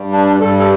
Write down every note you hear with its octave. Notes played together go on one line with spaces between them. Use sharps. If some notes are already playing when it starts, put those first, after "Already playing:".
Already playing: G2 G3
D4
G2 G3 A4
A4